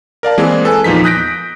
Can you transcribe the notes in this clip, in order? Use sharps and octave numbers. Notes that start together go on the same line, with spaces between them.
A#4 D5 F5 A5
E3 G#3 A#3 C4 G#4 D5
A4 B4 G#5
E2 A#2 F3 D#4 B6
D#6 F#6 G6 A#6 B6 D7